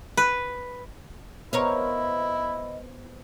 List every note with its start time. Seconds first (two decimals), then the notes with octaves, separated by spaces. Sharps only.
0.17 B4
1.53 B3 E4 A#4 C5 C#5 D#5 F5